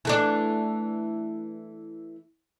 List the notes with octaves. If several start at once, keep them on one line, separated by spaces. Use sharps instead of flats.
E3 A3 D4